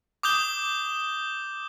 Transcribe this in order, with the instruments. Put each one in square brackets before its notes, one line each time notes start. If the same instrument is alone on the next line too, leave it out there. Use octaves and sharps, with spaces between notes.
[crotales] D6 D#6 G6 G7